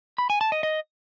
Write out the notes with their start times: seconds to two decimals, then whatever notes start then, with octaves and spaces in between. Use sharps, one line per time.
0.18 B5
0.30 G#5
0.41 A5
0.52 D#5
0.63 D#5